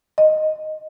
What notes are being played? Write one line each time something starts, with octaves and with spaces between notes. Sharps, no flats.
D#5